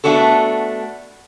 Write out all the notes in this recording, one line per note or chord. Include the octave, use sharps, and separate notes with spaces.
A3 B3 D4 F#4 A4